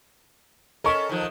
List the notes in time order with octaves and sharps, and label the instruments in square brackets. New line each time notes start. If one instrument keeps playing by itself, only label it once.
[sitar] C#4 A4 A#4 [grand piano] D#5 C#6
[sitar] D#3 F3